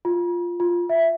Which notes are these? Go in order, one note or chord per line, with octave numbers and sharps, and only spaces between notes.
F4
F4
E5